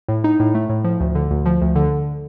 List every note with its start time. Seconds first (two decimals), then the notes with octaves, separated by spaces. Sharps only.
0.08 A2
0.24 D#4
0.40 A2
0.55 A3
0.69 A2
0.84 F3
1.00 D2
1.15 D3
1.31 D2
1.46 F3
1.61 D2
1.76 D3